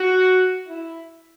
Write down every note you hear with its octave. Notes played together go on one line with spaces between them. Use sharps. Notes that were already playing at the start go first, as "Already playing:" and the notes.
Already playing: F#4
E4